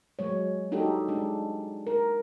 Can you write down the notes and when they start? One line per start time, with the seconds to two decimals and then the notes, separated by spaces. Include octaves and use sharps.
0.19 F#3 G#3 C#5
0.72 D4 D#4 F#4 G4 A4
1.08 G#3 D4
1.87 A#4